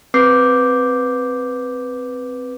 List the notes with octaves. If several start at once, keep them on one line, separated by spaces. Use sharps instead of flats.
C4 B4 D6 G6 C7